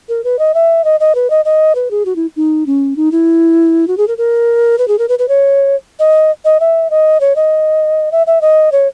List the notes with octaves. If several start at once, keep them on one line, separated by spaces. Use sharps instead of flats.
A#4
B4
D#5
E5
D#5
D#5
B4
D#5
D#5
B4
G#4
F#4
E4
D#4
C#4
D#4
E4
F#4
G#4
A#4
A#4
B4
G#4
A#4
B4
B4
C#5
D#5
D#5
E5
D#5
C#5
D#5
E5
E5
D#5
C#5